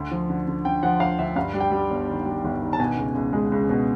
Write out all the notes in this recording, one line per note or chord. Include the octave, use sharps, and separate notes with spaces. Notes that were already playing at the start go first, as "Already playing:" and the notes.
Already playing: D2
F3
D3
D3
D3 G5
F3 F#5
D2 F5
D2 E5
G2 F5
G3
G5
G3
G1
D#3
G3
G1
D#3
A5
B2 G#5
C#2
C#2
G#3
C#2
B2